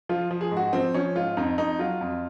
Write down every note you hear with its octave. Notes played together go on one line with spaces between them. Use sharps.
F3 F4
F3
G#4
G#2
F#4
F3 C4
F3 C#4
G#2 F4
F2 D#4
F2 D#4
F#3 F4
F2